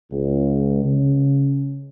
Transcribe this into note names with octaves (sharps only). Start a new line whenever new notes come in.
C#2
C#3